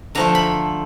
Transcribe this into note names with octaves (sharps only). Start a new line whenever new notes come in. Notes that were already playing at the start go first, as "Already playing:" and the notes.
D3 F3 A3 A#5
B5